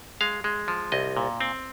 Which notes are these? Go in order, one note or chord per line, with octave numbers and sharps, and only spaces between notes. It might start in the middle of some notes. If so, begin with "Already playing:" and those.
G#3 F5
G#3
F3
C2 D#5
A#2
C4